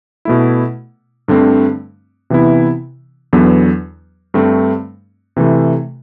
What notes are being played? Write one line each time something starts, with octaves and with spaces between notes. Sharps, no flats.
B2 A3 E4
G2 D3 A3 C4
C3 E3 B3 E4
E2 D3 F#3 B3
G2 D3 A3 C4
C3 E3 A3